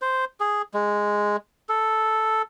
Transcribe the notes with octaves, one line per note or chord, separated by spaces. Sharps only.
C5
G#4
G#3
A4